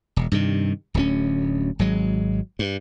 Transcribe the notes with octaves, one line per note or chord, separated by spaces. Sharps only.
E1
G2 C3 D#3
D1 D2 G3 C#4
G#1 F#3 G#3
G2